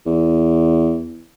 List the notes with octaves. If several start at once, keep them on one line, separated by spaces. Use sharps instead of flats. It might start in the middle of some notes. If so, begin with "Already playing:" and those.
E2